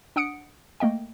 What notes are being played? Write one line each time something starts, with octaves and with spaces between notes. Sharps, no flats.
D4 F#5 D#6 C#7 D7
A3 A#3 D#5 G5